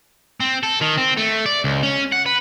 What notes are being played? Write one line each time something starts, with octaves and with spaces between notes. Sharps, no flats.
C4
A4
D#3
C4
A3
D5
C#2
C#4
F#5
B4